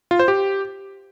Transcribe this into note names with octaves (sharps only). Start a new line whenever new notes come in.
F4
C5
G4